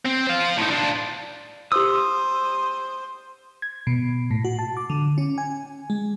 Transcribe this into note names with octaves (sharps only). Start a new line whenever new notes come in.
C4
C5 F5
A2 D#4
D4 F4
G4 C5 D#6 E6
G#6
B2
A2
F#4
A5
D6
D3
C#4
G#5
G#3